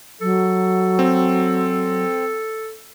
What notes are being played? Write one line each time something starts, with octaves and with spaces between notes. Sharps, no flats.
F#3 A4
C4